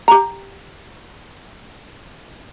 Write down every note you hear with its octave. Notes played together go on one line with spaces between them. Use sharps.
G4 A#5